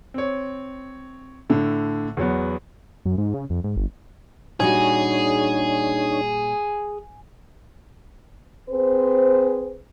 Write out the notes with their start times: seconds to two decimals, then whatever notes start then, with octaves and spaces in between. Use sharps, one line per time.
0.14 C4 C#5
1.50 A2 D3
2.17 E2 F#3 B3
3.05 F#2
3.18 G#2
3.34 C#3
3.50 F2
3.64 G#2
3.76 G1
4.60 A#2 G3 D4 D#4 F#4 G#4 C#5 G#5
8.69 C4 G#4 B4 C5